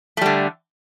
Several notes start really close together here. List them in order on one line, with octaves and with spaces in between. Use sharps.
A3 G3 D3